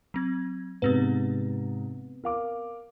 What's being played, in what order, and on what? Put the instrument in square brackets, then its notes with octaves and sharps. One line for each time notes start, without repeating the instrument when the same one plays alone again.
[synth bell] F#3 C4 G#6
[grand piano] G#2 C3 [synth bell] B3 C4 B4
[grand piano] A#4 F5 D6